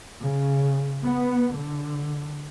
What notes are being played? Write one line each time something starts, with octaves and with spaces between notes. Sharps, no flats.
C#3
B3
D3